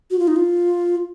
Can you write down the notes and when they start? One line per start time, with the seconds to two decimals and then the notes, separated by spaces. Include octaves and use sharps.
0.11 F#4
0.19 F4
0.28 D#4
0.36 F4